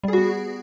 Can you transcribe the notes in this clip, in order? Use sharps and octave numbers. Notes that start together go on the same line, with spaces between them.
G3 B3 F#4 G#4